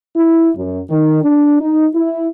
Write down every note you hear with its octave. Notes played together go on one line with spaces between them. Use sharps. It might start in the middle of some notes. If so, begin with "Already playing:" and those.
E4
F#2
D#3
D4
D#4
E4